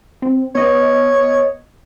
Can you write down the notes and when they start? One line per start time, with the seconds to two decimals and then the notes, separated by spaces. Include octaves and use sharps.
0.22 C4
0.55 B3 C#5 D#5